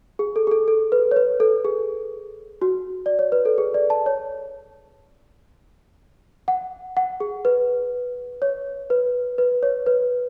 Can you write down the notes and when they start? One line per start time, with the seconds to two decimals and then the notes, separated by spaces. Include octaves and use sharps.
0.19 G#4
0.36 A4
0.47 G#4
0.51 A4
0.68 A4
0.92 B4
1.11 C#5
1.16 B4
1.40 A4
1.65 G#4
2.62 F#4
3.06 D5
3.19 C#5
3.32 B4
3.45 A4
3.58 G#4
3.74 D5
3.90 A5
4.06 C#5
6.48 F#5
6.97 F#5
7.20 G#4
7.45 B4
8.42 C#5
8.90 B4
9.38 B4
9.63 C#5
9.86 B4